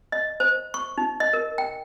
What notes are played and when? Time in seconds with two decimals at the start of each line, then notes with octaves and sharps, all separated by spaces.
0.12 D#5
0.40 C5
0.74 C#6
0.98 D#4
1.20 D#5
1.33 A#4
1.58 G5